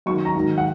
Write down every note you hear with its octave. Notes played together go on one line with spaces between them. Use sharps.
F#2 D#3 F#3 C#6
A#5
G#2 D#3 F#3
F#5